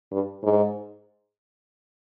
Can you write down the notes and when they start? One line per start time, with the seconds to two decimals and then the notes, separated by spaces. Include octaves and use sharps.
0.12 G2
0.43 G#2